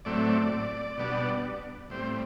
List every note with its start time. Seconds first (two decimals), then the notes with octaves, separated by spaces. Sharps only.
0.05 A2 F#3 A3 C4 D5
0.98 B2 G3 B3 D4
1.90 A2 G3 C4 C5